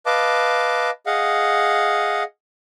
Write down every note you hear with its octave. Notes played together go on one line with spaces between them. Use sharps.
B4 D#5 F5 A5 D6
G#4 D#5 F5 F#5